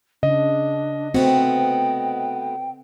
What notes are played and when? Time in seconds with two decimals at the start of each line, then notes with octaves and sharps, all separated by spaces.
0.23 C#3 D4 D#5
1.14 A3 B3 C4 F#4 G5